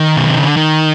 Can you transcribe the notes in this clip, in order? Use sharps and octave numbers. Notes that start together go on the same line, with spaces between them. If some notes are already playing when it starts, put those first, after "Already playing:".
Already playing: D#3
B2
C3
C#3
D3
D#3